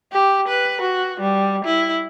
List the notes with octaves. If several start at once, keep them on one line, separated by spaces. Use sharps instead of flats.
G4
B4
F#4
G3
E4